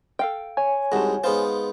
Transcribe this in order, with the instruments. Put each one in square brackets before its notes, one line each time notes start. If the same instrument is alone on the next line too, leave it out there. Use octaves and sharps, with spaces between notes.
[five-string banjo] A4 F5 G5
[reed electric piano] C#5 G#5
[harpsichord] C2 G#2 [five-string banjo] F#4 A5
[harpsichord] G#2 B3 F4 [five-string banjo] C5